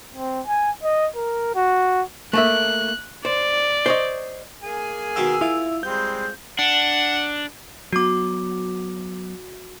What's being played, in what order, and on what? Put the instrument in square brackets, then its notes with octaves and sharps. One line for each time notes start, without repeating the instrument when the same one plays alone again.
[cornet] C4
G#5
D#5
A#4
F#4
[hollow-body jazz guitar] A3 A#3 E5 [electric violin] F#6
[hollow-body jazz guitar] C5 [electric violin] D5
[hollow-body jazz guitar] C5 C#5 D#5
[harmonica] A#3 G#4 G#5
[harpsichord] B2 D#3 G5 [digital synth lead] E6
[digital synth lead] E4 [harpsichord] F4
[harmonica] G3 G#3 C4 [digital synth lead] G6
[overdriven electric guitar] D4 [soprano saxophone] F#5
[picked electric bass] F#3 B3 [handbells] F#4 D6